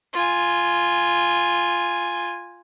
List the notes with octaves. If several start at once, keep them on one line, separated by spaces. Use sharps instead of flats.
F4 G#5